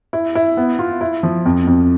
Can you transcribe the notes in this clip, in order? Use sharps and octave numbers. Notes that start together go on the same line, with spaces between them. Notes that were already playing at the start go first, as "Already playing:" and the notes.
E4
E4
B3
F4
E4
F3
F2
F2